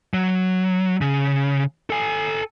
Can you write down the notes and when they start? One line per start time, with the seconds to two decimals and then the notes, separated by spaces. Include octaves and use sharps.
0.14 F#3
1.01 C#3
1.90 A4 G#5